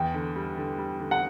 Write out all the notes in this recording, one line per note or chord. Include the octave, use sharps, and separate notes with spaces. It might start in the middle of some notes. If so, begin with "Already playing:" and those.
Already playing: E2 G5
D3
G3
D3
G3
D3
F#5